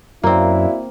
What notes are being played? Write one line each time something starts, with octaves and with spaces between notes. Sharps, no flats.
F#2 A#3 C4 E4 F#4 D5 F5